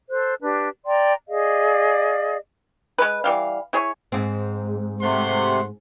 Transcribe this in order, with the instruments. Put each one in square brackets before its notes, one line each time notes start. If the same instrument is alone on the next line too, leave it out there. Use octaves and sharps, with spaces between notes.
[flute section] A4 C5 F#6
D4 G4 B4
D5 G5 A#5 C6
G#4 D5 D#5 F5
[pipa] G#3 B4
E3 G3 F5
E4 G#4 C#5
[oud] G#2 C4
[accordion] C3 [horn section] A3 F#5 C6 [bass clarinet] C5